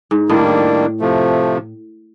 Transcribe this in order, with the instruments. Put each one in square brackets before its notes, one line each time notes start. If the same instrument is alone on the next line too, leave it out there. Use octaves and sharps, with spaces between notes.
[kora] G#2
[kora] A2 [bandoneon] D#3 G3 A#3 D4
[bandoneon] C3 F3 A3